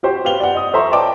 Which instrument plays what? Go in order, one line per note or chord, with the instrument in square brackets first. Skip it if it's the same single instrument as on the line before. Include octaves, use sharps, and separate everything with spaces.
[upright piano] F#4 G4 C5
G4 B4 F5 F7 G7
D5 F#5
D#5 D#6
A4 C5 E5 A#5 C6 C#6
B4 D5 D#5 G5 A5 D6